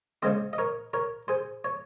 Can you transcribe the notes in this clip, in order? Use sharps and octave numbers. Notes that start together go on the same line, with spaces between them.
C#3 G#3 C4 C5 D#5
D#5
A#4 C#5
A#4 C#5
G#4 C5
C#5